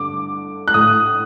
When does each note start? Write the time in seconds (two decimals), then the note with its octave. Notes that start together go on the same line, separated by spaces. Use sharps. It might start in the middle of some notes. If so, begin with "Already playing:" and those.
Already playing: G2 D3 D6
0.68 F#6
0.74 A2 D#6